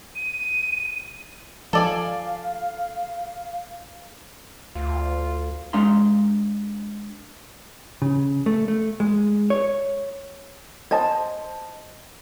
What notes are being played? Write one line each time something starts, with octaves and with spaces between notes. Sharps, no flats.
D#7
F3 A4 D5 F5 G#5
D2 F4
G#3 D4 F5 A#5 C6
C#3
A3
A3
G#3
C#5
C5 D#5 A5